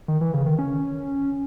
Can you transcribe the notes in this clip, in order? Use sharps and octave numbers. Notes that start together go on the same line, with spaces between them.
D#3
E3
C#3
D#3
C#4